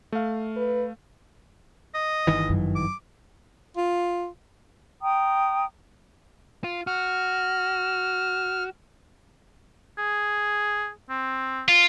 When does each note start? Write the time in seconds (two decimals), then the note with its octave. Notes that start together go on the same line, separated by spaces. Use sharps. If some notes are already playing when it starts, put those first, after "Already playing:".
0.12 A3 F5
0.56 B4
1.94 D#5
2.27 G1 D#3 E3
2.49 F#2
2.76 D6
3.77 F4
5.01 G5 A#5 D#6
6.64 F4
6.87 F#4 F6
9.98 G#4
11.09 C4
11.68 F4